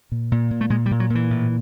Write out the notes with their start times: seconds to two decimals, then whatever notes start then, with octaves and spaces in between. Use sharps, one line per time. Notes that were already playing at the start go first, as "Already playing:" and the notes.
0.12 A#2
0.32 A#2
0.51 A#2
0.61 A3
0.70 A#2 G#3
0.86 G3
0.91 A#2
1.00 F#3
1.10 A#2
1.15 E3
1.31 A2